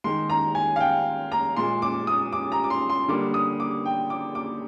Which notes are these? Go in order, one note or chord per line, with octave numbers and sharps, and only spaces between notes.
D#3 G#3 C6
A#5
G#5
F5
G5
A#5
A#2 G#3 C6
D6
D#6
D6
A#5
D6
C6
C6
D3 G3 A#3 D6
D#6
D6
G5
D6
D6